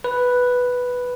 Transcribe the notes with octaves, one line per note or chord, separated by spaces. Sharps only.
B4